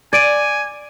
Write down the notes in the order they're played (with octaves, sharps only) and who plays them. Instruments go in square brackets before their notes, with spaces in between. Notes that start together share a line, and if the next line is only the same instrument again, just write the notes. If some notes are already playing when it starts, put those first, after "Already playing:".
[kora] D5 [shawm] G#5 [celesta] G#6 D7 D#7